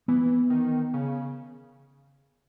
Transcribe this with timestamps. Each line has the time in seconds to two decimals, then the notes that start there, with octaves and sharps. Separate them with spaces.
0.08 E3 B3
0.50 D#3
0.94 C#3